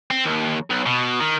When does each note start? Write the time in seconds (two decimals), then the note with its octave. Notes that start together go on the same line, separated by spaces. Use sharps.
0.11 C4
0.26 D#2
0.70 B1
0.86 B2
1.20 D#3